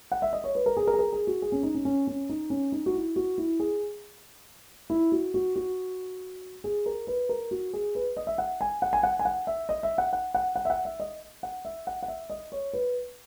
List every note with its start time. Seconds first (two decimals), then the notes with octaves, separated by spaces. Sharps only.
0.12 F#5
0.22 E5
0.33 D#5
0.44 C#5
0.55 B4
0.66 A#4
0.77 G#4
0.87 A#4
0.93 G#4
0.99 A#4
1.12 G#4
1.27 F#4
1.42 G#4
1.52 C#4
1.63 D#4
1.74 C#4
1.85 C#4
2.07 C#4
2.29 D#4
2.50 C#4
2.72 D#4
2.86 F#4
2.94 E4
3.16 F#4
3.38 E4
3.60 G#4
4.90 E4
5.12 F#4
5.34 F#4
5.56 F#4
6.64 G#4
6.86 A#4
7.07 B4
7.29 A#4
7.51 F#4
7.73 G#4
7.95 B4
8.17 D#5
8.27 E5
8.38 F#5
8.61 G#5
8.82 F#5
8.93 G#5
9.03 F#5
9.19 G#5
9.25 F#5
9.47 E5
9.69 D#5
9.83 E5
9.98 F#5
10.13 F#5
10.34 F#5
10.56 F#5
10.65 E5
10.70 F#5
10.85 E5
11.00 D#5
11.43 F#5
11.65 E5
11.87 F#5
12.03 F#5
12.08 E5
12.30 D#5
12.52 C#5
12.73 B4